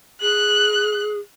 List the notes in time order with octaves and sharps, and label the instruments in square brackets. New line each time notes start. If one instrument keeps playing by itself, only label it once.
[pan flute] G#4 [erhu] F#6